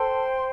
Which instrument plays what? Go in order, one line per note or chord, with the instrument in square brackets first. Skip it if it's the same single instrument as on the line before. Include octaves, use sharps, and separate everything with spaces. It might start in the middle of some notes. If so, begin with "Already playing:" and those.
Already playing: [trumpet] A4 [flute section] C5 G5 C6